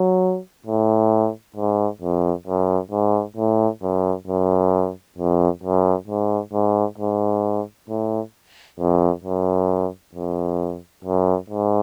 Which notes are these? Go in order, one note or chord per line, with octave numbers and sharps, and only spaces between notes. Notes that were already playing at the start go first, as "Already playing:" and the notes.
Already playing: F#3
A2
G#2
F2
F#2
G#2
A2
F#2
F#2
F2
F#2
G#2
G#2
G#2
A2
F2
F#2
F2
F#2
G#2